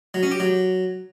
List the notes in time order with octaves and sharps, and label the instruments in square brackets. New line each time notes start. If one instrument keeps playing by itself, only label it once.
[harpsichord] F#3
C#4
G4
F#3